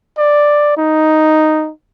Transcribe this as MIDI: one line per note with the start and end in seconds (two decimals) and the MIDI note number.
0.17 0.75 74
0.77 1.70 63